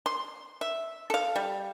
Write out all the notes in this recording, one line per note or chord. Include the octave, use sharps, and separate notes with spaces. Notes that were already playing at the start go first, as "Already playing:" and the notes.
C6
E5
A4 F5
G3